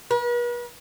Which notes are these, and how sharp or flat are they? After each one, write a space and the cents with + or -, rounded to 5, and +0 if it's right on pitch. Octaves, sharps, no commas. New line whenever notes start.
B4 -45